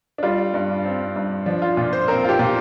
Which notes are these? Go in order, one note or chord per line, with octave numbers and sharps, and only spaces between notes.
D4
G3 F4
G2
C4
G2
F3 D4
F4
A#2 F4
C5
C4 A#4
F4
G4
A#2